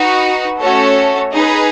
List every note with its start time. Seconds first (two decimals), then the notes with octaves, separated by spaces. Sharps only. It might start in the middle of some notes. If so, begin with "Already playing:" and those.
Already playing: D#4 F#4 B4
0.59 A3 C#4 F#4 A4 C#5
1.33 D#4 G#4 B4